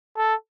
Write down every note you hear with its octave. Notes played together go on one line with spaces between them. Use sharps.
A4